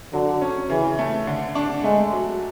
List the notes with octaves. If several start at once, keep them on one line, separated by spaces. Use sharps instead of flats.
D3 F#3
C#4
C#3 E3
A3
D3
D4
G#3 A3
F#3